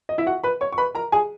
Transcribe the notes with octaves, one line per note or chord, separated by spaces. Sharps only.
D#5
E4 E5
F#4 F#5
B4 B5
C#5 C#6
C#6
B4 B5
A#4 A#5
G#4 G#5